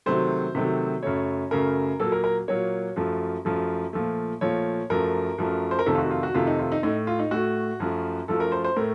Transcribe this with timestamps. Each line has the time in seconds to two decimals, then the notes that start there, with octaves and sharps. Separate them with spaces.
0.06 C3 D#3 F#3 A3 C5
0.55 C3 D#3 F#3 A3
1.03 F#2 C#3 A3 C#5
1.51 F#2 C#3 A3 A#4
2.00 A#2 F#3 A#3 A4
2.12 A#4
2.24 A#4
2.48 A#2 F#3 A#3 C#5
2.96 F#2 F3 A3
3.45 F#2 F3 A3
3.93 A#2 F3 A3
4.41 A#2 F3 A3 C#5
4.90 F#2 F3 A3 A#4
5.38 F#2 F3 A3
5.71 C5
5.79 A#4
5.86 F2 C3 D#3 A3 A4
5.95 F4
5.98 F#4
6.11 F4
6.23 F#4
6.34 F2 C3 D#3 A3 F4
6.47 D#4
6.59 F4
6.72 D#4
6.83 A2 A3 D#4
7.07 F4
7.19 D#4
7.31 A2 A3 F#4
7.80 F#2 F3 A3
8.28 F#2 F3 A3 A4
8.40 A#4
8.52 C5
8.64 C5
8.77 A2 A3 A#4